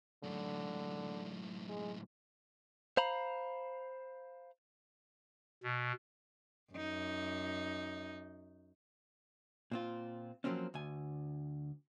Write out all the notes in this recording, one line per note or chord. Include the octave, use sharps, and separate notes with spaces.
F#2 A2 D3
G#3
C5 F5 A#5 B5
B2
F#2 D#4
A#2 C4 F4
F3 F#3 A#3 C4 C#4
D2 G#5